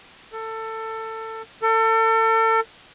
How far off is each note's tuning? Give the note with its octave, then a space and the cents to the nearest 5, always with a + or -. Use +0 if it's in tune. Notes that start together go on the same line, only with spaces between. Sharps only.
A4 +20
A4 +35